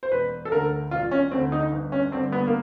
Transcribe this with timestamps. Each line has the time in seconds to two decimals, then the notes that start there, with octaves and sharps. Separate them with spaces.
0.03 C5
0.12 E1 B4
0.45 A4
0.52 D2 D3 A#4
0.91 E1 F4
1.11 C#4
1.31 D2 D3 C4
1.52 D#4
1.72 G1
1.92 C#4
2.12 G2 D3 C4
2.32 B3
2.47 A#3